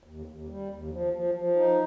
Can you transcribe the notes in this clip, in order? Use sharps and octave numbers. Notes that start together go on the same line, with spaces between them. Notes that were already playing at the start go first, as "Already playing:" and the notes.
D#2
D#2
G3
D#2
F3
F3
F3
D#4